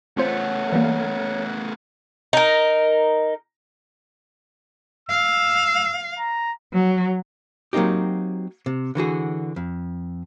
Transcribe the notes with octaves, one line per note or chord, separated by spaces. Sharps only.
A3 B3 C4 F4 C5 C#5 F#5
E3 G3 A#3
D#4 A#4
F5 E6
A#5
F#3
F#3 A#3 C4 D#4 G4
C3
D3 E3 F#4 G#4
F2